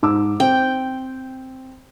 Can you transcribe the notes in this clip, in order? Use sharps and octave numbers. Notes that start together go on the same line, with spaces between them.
G#2 D6 E6
C4 G5